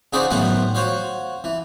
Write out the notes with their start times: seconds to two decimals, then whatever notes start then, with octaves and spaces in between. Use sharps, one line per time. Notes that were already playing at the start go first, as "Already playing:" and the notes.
0.13 C#3 D#4 F#4 G#4 C5 D5
0.31 A2 D#3 F#3 B3 C5 F#5
0.75 F#4 C5 C#5 F5
1.44 E3